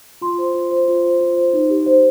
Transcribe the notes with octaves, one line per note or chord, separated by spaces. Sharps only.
F4 C6
C5
F4
C5
F4
C5
F4
C5
D#4
G4
C5